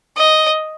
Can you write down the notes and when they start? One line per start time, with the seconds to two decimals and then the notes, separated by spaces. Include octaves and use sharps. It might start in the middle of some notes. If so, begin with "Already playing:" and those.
0.17 D#5